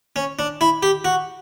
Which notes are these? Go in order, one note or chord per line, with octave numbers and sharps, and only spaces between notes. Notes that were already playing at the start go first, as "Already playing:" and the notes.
C#4
D4
E4
G4
F#4